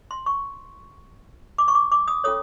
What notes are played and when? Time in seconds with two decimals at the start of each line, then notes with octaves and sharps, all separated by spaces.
0.11 C6
0.26 C#6
1.58 D6
1.68 C#6
1.75 D6
1.92 D6
2.08 D#6
2.24 C#4 F4 A4 C#5 D#6